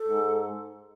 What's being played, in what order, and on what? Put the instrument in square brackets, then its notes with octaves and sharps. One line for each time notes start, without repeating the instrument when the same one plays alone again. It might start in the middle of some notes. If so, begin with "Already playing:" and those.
Already playing: [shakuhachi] A4
[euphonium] G#2